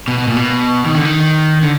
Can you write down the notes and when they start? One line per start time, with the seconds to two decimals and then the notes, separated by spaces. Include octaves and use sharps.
0.08 B2
0.18 B2
0.28 A#2
0.36 B2
0.86 D#3
0.95 D3
1.05 D#3
1.63 D3